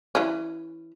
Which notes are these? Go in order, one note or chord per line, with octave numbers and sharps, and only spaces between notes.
E3 C#4